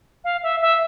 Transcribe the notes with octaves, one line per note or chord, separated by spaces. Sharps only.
F5
E5
E5